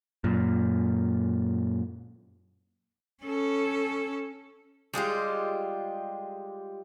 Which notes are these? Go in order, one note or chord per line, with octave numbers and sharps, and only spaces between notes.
F#2 A#2
C#4 A4
G3 G#3 F4 G4